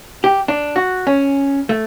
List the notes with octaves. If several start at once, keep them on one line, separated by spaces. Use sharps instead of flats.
G4
D4
F#4
C#4
A3